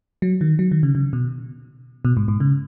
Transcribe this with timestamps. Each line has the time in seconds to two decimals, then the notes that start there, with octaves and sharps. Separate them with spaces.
0.22 F#3
0.41 D#3
0.59 F#3
0.72 D#3
0.83 C#3
0.95 C#3
1.13 B2
2.05 B2
2.17 G#2
2.28 G#2
2.40 C#3